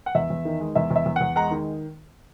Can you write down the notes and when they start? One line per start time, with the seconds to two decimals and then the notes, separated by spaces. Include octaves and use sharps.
0.06 F#5
0.15 E2 E5
0.30 E2
0.45 D#3
0.61 G#3
0.75 E2 E5
0.91 E2
0.96 E5
1.06 E2
1.16 E2 F#5
1.36 G#3 F#5 A#5
1.51 D#3